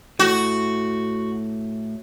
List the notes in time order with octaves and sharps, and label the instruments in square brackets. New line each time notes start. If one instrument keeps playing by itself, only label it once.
[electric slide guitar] A2 [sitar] F#4